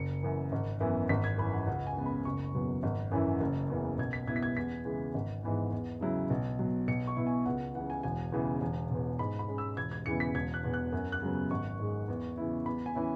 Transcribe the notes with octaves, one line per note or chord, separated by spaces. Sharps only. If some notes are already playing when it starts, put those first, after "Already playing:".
Already playing: F#1 C#7
F#2 E3
G#1
F#2 E3 B3 E4
G#1 B6
G#6
F#2 E3 B5
F#5
C#2 F#5
G#5
C#3 G#3 B3
B5
F#1 C#6
E2 B2 F#3
G#1
F#2 E3 C#4 E4
F#1
E2 C#3 E3
B1 G#6
B6
B2 B3 E4 G#6
B6
G#6
E2 B6
C#3 E3 G#3
G#1
G#2 E3 B3
E2
C#3 F#3 E4
B1
B2 F#3
B1 C#7
C#6
B2 B3 E4
G#5
C#2 F#5
C#3 E3 F#5
G#5
E1 G#5
E2 C#3 E3 G#3
E1
E2 B2
G#2 B5
B5
G#3 C#4
E6
E1 G#6
G#6
E2 C#3 E3 B3 C#7
B6
E1 G#6
F#6
E2 B2
F#6
F#2
F#6
C#3 F#3 B3
G#1 C#6
G#2 G#3
E2
C#3 E3 B3 E4
E2 B5
G#5
E3 C#4 E4